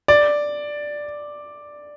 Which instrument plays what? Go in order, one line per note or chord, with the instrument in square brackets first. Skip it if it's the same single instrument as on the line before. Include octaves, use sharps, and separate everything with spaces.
[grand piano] D5